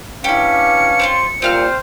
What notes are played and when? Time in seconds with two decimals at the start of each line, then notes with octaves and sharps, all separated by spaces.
0.24 C#4 D4 E4 G4 B4 F5 C#7
0.99 C4 E4 F4
1.42 C2 A#2 C4 C5 F5 F6